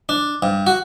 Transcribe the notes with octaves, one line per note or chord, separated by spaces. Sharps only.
D4
G2
F#4